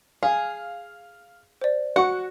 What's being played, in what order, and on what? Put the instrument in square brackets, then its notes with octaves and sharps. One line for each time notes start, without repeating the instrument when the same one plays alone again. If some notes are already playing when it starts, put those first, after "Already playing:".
[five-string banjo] G#4 [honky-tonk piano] F5
[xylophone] C5 D5
[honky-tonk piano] F#4 C#6 [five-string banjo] F#5